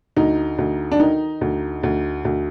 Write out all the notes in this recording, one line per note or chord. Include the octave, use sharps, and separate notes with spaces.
D2 D#4
D2
D4
D#3 D#4
D2
D2
D2